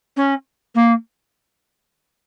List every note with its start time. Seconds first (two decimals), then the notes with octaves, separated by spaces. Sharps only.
0.17 C#4
0.75 A#3